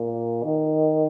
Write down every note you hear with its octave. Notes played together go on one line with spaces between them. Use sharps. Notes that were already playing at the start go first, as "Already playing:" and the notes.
Already playing: A#2
D#3